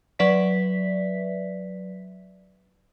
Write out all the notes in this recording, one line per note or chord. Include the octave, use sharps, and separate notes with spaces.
F#3 B4 D5 E5 B6